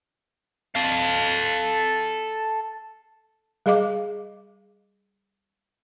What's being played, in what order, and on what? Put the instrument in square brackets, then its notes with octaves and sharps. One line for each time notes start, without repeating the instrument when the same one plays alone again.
[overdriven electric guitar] A4 F5
[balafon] G3 G#4 D#5 F5 D6